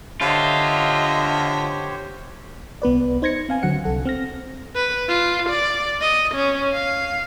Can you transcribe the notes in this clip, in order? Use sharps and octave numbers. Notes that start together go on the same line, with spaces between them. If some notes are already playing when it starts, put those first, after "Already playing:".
D3 F4 G4 C5 C#5 D#5 E5
C2 B3 B4 D5
D#4 C5 G#6 A#6 C#7
C4 F5 G#5
D3 F#3 F#5 C#7
C2 A4 F#5
C4 F6 A#6
B4
F4
D5
D#5
C#4
F5